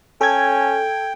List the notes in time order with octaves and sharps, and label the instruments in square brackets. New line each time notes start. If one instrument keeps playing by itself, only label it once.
[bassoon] C#4 [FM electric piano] A4 G#6 [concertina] G5